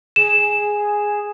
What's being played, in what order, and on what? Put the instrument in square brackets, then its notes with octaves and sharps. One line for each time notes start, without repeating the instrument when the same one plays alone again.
[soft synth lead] G#4 [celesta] E7